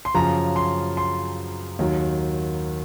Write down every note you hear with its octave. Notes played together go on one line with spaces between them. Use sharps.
C6
F#2 C#3 F3 A#5
C6
C6
D#2 D#3 F#3